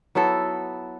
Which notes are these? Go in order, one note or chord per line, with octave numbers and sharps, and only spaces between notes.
F#3 B3 E4 A4